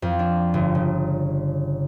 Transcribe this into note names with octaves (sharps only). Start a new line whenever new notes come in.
F2
D4
G1
C#3